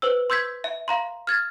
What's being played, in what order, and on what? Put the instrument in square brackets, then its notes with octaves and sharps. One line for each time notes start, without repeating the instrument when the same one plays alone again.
[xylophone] B4 C5 E6
C6 E6 G6 G#6 B6
E5
F5 A#5 C6
F6 G#6 A6